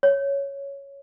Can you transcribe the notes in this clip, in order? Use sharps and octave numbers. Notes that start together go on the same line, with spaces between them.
C#5